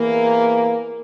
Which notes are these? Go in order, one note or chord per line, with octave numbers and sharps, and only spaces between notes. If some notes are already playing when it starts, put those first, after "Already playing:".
Already playing: E2 E3 A#3